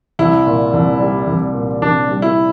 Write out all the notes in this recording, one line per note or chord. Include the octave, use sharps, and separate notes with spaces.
C2 E4
A#2
C2
G3
C2
A#2
C2 D4
G3
E4